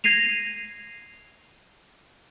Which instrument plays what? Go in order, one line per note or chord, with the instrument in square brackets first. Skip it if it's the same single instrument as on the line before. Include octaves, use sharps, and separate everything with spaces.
[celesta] G#6 A#6 C7 D#7 F7